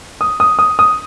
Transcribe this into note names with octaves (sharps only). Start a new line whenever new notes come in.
D#6
D#6
D#6
D#6